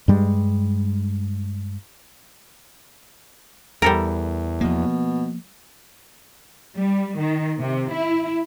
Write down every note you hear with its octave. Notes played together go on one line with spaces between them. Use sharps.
G2 G3 G#3
E2 G3 A4 A#4
B2 F3 A#3
G3
D#3
C3
E4